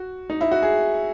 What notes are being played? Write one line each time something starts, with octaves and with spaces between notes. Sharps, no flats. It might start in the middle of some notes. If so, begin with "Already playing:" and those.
Already playing: F#4
D#4
E4
F#4
G#4